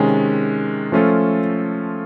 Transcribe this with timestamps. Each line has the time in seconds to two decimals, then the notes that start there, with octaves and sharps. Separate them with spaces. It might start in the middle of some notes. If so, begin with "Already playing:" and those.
Already playing: C3 D#3 G#3 C#4
0.92 F3 A3 C#4 F4 A4